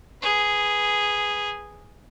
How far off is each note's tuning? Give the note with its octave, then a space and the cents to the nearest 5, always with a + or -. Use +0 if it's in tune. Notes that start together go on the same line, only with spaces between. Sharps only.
G#4 -5 B4 +0